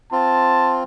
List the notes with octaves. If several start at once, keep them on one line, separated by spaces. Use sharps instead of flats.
C4 F4 A5